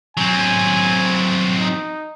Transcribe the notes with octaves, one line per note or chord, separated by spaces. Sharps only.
F#3 C4 G#5
D#4